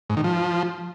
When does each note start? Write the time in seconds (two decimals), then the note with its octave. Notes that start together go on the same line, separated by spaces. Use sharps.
0.10 G#2
0.17 D#3
0.24 F3